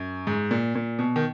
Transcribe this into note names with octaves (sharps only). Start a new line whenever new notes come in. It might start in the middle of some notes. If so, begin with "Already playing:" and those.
Already playing: F#2
G#2
A#2
A#2
B2
D#3